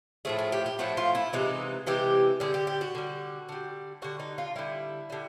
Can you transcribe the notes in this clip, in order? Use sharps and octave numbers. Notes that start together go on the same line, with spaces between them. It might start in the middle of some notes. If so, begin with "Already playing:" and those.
A2 F3 A3 G#4
G#4
G4
G4
A2 F3 A3 F#4
F4
E4
C3 E3 G#3 D#4
C3 E3 G#3 G4
D3 G3 G#4
G4
G4
F#4
D3 G3
D3 G3
D3 G3 F#4
D#4
F4
D3 G3 E4
D3 G3